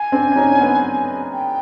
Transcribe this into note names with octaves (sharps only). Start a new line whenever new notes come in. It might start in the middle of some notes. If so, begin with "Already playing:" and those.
Already playing: G#5
C4 D4
D4
C#4 D#4
B3 C#4
G5